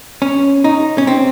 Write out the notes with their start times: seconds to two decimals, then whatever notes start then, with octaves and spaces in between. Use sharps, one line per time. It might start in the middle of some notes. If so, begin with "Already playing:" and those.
0.22 C#4
0.64 D#4
0.98 C#4
1.07 C4